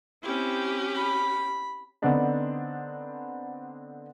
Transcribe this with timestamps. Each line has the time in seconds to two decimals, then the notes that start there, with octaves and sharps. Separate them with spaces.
0.23 C4 C#4 E4 G4
0.95 B5
2.02 D3 B3 C4 D4 D#4